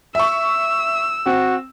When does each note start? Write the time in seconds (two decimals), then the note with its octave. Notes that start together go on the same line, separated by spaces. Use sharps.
0.15 E5 C#6 E6
1.26 C4 F#4